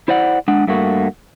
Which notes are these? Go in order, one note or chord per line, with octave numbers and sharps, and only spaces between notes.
E4 C5 D5 F#5
G#3 D4 F#5
G2 A3 A#3 F#4